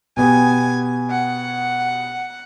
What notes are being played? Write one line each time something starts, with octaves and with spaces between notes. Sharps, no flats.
B2 B3 G4 G#5
F#5